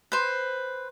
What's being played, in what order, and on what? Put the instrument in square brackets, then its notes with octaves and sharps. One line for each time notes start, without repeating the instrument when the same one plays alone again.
[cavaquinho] B4 C5